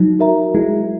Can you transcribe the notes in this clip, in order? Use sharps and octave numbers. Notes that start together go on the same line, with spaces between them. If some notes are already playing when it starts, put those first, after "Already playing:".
Already playing: F#3 D#4
F#4 A#4 E5 A#5
G#3 E4